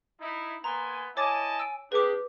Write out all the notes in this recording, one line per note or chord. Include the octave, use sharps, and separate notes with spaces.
D#4 E4
A#3 B3 G#5 A#5 C6
E4 C#5 D#5 G#5 A5 D6 A6
E6 D7
C4 D4 G4 G#4 B4 D6